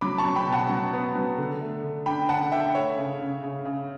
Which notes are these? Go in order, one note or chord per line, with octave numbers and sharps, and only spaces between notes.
F#3 B5 D6
A5 C#6
F#3
G5 B5
B2
F#5 A5
F#3
B3
F#3
D3
A3
D3
D4 G5 B5
D3 F#5 A5
D4 E5 G5
A3 C#5 E5
C#3
C#3
C#3
C#3